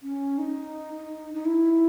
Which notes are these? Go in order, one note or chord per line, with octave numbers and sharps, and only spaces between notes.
C#4
D#4
D#4
E4